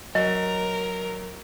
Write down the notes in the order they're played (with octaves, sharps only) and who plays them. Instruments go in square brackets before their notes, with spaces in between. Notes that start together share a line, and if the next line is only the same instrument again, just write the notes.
[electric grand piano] F#3 [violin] A#4 [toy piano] D#5